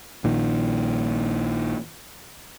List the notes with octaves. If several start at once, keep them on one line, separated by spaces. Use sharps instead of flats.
A#1 A#2 D#3